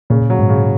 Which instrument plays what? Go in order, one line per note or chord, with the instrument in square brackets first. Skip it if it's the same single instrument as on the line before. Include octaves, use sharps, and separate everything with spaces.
[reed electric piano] A#2 [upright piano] C#3
[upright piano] F#3
[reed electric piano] G#2
[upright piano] C#3